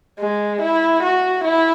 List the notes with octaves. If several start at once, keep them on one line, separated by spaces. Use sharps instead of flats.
G#3
E4
F#4
E4